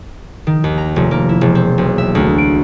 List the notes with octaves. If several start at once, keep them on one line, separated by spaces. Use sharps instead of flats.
D#3
D#2
A#5
F1
A#3
E4
E1
C4
B1
E5
D2
D7